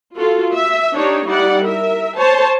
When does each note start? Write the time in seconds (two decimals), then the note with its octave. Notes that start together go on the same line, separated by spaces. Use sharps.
0.15 F4 F#4 A4
0.53 E5
0.96 D4 D#4 G4 C#5
1.28 G3 D#4 E4 D5 F#5
1.64 A#4 E5
2.17 C5 C#5 A5